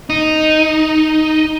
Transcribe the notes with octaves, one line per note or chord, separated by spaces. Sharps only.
D#4